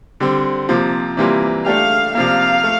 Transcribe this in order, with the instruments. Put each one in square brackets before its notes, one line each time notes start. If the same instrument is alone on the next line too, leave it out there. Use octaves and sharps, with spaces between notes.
[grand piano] D3 G3 C4
C3 F3 A#3
C3 E3 G3 A#3 F4
[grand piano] A3 D4 G4 [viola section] F5
[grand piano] C3 F3 A#3 [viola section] F5
[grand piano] A3